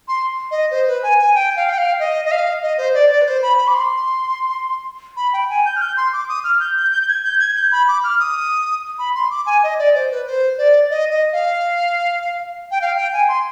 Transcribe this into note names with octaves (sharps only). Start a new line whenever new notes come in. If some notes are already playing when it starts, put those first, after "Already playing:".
C6
D#5
C5
B4
G#5
G#5
G5
F5
G5
F5
D#5
D#5
F5
D#5
C5
D5
D5
B4
C5
B5
B5
D6
C6
B5
G5
G#5
G6
F6
G6
C6
D6
D#6
F6
G6
G6
G6
G6
G#6
G6
G#6
G6
B5
D6
F6
D#6
B5
C6
D6
G#5
D#5
D5
C5
B4
C5
D5
D#5
D#5
F5
G5
F5
G5
G#5
C6